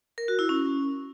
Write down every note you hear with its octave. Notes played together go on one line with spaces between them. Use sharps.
A#4
F#4
E4
C#4